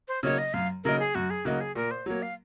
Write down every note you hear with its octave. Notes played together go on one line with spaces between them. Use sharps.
C5
C#3 F#3 A#3 D#4 C#5
D#5
F#2 F5
C#3 F#3 A#3 D#4 A#4
G#4
F#2 F#4
G#4
C#3 F#3 A#3 D#4 F#4
G#4
A#2 A#4
C5
F#3 A#3 C#5
F5